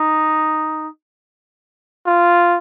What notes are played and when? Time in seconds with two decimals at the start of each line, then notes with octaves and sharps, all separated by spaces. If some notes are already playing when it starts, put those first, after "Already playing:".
Already playing: D#4
2.07 F4